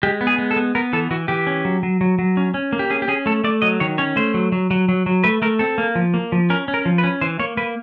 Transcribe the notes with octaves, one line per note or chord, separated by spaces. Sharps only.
G#3 G4
B3
G#4
G#3
A4
B3
B3 A#4
E3 A4
E3 F#4
E3 G4
C#4
F#3
F#3
F#3
F#3
C#4
C#4
A#3
G4
C#4 G#4
G4
C#4 G#4
A3 A4
A3 D5
F#3 D#5
D#3 C#5
C#4 C#5
A3 C5
F#3
F#3
F#3
F#3
F#3
A3 B4
A3 A#4
C4 A4
A#3
F3
A#3
F3
C#4 A#4
C#4
A#4
F3
B4
C#4
E3 C5
A#3 C#5
A#3 B4